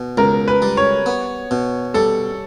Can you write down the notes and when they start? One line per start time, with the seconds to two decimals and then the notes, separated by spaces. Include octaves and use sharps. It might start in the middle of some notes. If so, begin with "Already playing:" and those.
Already playing: B2
0.18 C#2 A#4
0.48 B4
0.62 G3
0.77 C#5
1.06 B3
1.51 B2
1.94 G3 A4